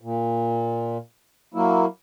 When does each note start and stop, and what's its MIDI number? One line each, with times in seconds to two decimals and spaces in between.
0.01 0.98 46
1.54 1.86 54
1.54 1.86 58
1.54 1.86 64